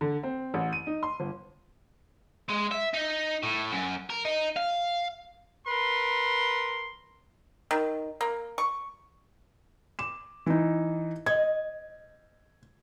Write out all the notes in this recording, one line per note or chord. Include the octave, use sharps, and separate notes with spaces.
D3
C4
A1
D#7
D#4
C6
G1
G#3
E5
D#4
A2
F#2
A#4
D#4
F5
A#4 B4 C6
D#3
A#3
C#6
D6 E7
E3 D#4
D#5 G#6